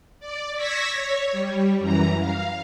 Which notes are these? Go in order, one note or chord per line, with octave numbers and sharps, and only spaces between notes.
D5
C#6 E6 G#6 A#6 B6
C#5
G3
F#2 E3 A#5
F5